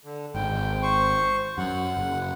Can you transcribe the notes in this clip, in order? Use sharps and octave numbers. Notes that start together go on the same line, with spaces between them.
D3
G#1 G#2 G5
C5 C#6
F#2 F#5
F#1